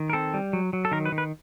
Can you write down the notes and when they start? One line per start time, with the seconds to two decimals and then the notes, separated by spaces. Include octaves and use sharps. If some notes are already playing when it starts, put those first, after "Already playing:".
Already playing: D#3
0.10 A#4
0.13 C4 A4
0.34 G3
0.53 F#3
0.73 F#3
0.85 A4
0.92 D#3 A#4
1.05 B4
1.12 D#3
1.18 B4